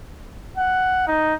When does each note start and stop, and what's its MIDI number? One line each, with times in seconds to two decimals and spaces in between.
0.57 1.06 78
1.07 1.34 63